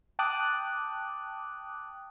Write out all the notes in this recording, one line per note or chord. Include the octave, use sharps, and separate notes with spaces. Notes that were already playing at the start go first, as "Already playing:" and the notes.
G5 A5 D6 D#6 F#6